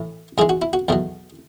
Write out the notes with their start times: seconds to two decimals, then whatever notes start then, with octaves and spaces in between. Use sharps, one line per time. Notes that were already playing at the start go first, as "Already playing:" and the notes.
Already playing: A2 E3
0.38 G#2 E3 G#3 G#4
0.49 F#4
0.62 E4
0.73 F#4
0.88 E2 B2 F#3 A3